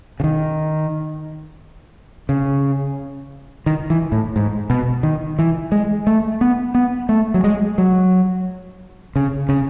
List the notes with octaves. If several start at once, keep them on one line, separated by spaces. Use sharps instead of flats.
C#3
D#3
C#3
D#3
E3
A2
G#2
B2
D#3
E3
G#3
A3
B3
B3
A3
F#3
G#3
F#3
C#3
C#3